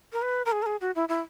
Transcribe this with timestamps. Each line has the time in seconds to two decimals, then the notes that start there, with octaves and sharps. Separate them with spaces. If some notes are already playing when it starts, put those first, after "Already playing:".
0.13 A#4
0.22 B4
0.46 A#4
0.52 G#4
0.62 A#4
0.66 G#4
0.81 F#4
0.96 E4
1.09 E4